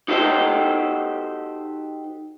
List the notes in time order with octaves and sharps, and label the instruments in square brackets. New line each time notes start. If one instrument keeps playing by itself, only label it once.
[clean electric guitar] D#4 F#4 G4 A4 C5 D#5